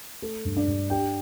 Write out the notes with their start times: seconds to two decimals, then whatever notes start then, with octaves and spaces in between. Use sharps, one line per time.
0.22 A3 A4
0.45 G2
0.56 D4 D5
0.67 G2
0.90 D4 G4 G5